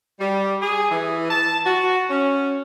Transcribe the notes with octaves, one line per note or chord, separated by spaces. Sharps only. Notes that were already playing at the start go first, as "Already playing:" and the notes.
G3
G#4
E3
A5
F#4
C#4